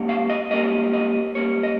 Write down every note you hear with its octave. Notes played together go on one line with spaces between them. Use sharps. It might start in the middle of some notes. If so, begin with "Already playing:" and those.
Already playing: G#2 G3 A#3 C#4
F5
D#5
G#2 G3 A#3 C#4 D#5
D#5
G#2 G3 A#3 C#4 C#5
D#5